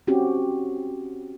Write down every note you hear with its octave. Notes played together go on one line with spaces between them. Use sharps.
C4 C#4 F#4 G4